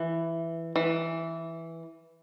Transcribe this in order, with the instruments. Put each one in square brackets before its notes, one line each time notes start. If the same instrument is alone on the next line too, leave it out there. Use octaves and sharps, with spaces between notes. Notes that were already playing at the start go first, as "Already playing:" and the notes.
Already playing: [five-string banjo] E3
E3